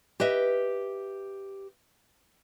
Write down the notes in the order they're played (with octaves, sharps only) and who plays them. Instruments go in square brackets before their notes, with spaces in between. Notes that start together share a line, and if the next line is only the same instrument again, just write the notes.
[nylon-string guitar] G4 B4 D#5 E5